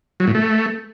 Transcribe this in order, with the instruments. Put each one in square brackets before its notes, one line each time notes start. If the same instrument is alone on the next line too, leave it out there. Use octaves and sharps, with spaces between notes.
[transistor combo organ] F#3
A2
A3